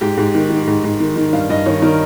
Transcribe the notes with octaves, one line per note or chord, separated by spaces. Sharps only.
G#2 G4
G#2
D#3
D#3
G#2
G#2
D#3
D#3
G2 F5
G2 D#5
D#3 C#5
D#3 A#4